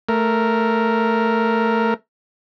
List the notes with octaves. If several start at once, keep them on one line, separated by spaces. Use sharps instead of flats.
A3 A#4